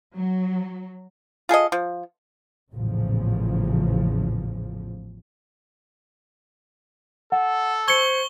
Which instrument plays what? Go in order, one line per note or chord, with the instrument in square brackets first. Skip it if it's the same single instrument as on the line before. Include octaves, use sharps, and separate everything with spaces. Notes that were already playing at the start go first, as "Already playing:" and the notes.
[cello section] F#3
[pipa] F4 G#4 A4 D#5
F3
[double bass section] A1 E2 A#2 C#3 F3
[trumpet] A4 [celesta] F#5
[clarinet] C5 [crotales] C#6 G7 [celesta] G#6 C#7